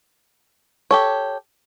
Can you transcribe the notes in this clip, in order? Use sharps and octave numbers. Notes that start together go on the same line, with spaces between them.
G4 A4 C#5